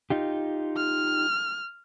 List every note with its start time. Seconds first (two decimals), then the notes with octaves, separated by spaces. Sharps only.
0.10 D#4 F4 G4
0.77 F6